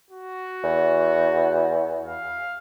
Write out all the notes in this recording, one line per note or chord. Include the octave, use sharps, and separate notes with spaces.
F#4
E2
F5